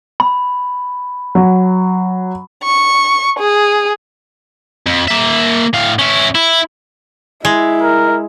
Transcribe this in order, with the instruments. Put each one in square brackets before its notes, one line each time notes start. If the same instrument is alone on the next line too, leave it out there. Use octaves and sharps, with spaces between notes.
[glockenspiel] B5
[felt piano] F#3
[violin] C#6
G#4
[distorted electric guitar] F2
A#3 E5
A2 F5
C#4 E4
E4
[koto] G#3 [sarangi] E4
[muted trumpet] A#4